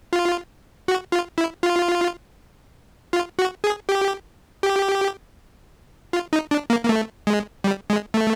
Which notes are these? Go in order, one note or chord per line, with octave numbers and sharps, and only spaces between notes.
F4
F#4
F4
E4
F4
F4
F#4
G#4
G4
G4
F4
D#4
D4
A#3
A#3
A3
G#3
G3
G#3
A3